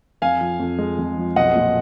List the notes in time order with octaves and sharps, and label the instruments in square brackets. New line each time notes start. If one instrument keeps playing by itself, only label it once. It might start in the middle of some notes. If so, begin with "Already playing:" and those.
[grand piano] F2 F5 G#5
F3
F2
G#3
F2
F3
B1 D#5 F#5
A#2